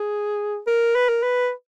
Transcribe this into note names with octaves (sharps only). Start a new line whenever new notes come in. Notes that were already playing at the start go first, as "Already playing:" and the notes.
Already playing: G#4
A#4
B4
A#4
B4